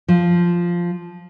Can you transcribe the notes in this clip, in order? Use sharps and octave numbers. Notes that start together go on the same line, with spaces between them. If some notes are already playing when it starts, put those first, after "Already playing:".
F3